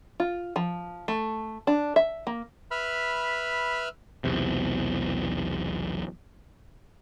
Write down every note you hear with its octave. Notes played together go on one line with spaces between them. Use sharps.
F4
F3
A3
D4
E5
A#3
B4 E5 B5 F6
B1 E2 C3